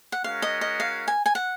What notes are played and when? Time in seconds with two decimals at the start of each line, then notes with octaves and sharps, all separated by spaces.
0.12 F#5
0.24 G#3 C#4 F#4 A#4 F5
0.42 D#5
0.61 D#5
0.80 F5
1.08 G#5
1.26 G#5
1.35 F#5